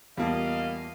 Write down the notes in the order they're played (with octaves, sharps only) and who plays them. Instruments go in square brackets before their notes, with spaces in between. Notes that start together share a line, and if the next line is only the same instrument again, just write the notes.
[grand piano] E2 F4 A5 [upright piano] G3 A#3 [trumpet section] D#5 F5